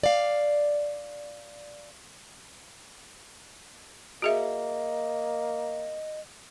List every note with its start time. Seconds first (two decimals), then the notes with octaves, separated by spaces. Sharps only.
0.03 D5 F5
4.22 A#3 F#4 G#4 D#5 E5